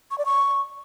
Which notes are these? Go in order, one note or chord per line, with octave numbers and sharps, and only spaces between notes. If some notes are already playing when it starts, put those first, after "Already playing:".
C#6
D5
C#6